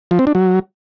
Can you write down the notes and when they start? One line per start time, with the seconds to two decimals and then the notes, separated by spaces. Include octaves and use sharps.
0.11 F3
0.19 C4
0.27 D4
0.35 F#3